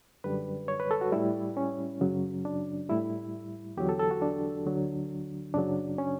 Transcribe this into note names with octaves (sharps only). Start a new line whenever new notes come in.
F#2 D3 G3 B4
C#5
B4
A4
F#4
A2 G3 E4
C#4
F#2 C#3 F#3
D4
A2 G3 E4
E2 D3 F#3 G4
A4
A4
F#4
D4
D2 D3 F#3
F#2 C#3 F#3 D4
C#4